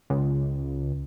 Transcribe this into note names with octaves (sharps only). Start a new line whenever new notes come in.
C#2